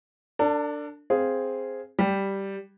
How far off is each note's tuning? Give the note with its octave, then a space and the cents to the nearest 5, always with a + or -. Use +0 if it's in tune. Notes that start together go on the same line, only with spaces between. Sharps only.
D4 +0 A4 +45
C4 +0 G#4 +0 F5 +0
G3 +0 G4 +0